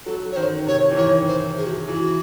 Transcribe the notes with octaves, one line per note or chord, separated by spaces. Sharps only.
F#3 A4
C#5
D#3 C5
C3 C#5
E3
D#3 C#5
C5
G#4
F#4
G#4
E3 F#4